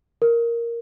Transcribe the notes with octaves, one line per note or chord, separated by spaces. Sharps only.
A#4